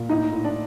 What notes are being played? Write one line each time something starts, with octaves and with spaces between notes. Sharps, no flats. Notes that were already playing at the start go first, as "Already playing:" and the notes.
Already playing: A#2
A2 D#4 D#5
A2
D4 D5